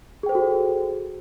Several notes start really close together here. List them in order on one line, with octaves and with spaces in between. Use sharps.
G#4 G5 C5 A4 F#4